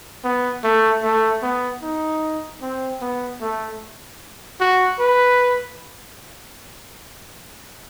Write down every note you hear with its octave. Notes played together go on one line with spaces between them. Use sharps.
B3
A3
A3
B3
D#4
C4
B3
A3
F#4
B4